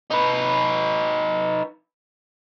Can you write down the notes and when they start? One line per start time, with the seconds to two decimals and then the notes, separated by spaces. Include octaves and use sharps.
0.10 D#4 B4